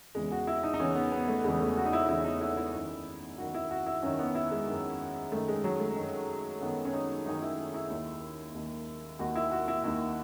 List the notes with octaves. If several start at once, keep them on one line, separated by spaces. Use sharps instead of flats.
E2 C#3 E3 G#3
F#4
E4
D#4
D#4
E2 C#3 E3 C#4
B3
B3
A3
E2 C#3 E3 G#3
A3
F#4
D#4
E4
E2 C#3 E3 E4
D#4
E4
E4
F#2 D#3
F#2 D#3 F#4
E4
F#4
E4
F#2 D#3 C#4
B3
E4
G#3
F#2 D#3
F#2 D#3 A3
G#3
F#3
A3
F#2 D#3
F#2 D#3 B3
C#4
D#4
F#2 D#3 D#4
E4
E4
D#2 D#3
D#2 D#3
D#2 D#3 F#4
E4
F#4
E4
D#2 D#3 E4